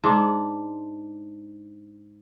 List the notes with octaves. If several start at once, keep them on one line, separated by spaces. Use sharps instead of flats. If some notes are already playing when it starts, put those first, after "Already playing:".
G#2 D4